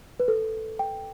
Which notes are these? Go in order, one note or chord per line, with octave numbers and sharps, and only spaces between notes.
B4
A4
G5